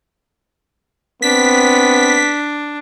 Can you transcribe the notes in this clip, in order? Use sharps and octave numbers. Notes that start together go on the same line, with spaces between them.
B3 C4 D4 B6